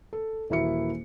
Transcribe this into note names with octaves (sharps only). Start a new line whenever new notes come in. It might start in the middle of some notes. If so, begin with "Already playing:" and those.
A4
D#1 E3 A#3 E4 F#4 C#7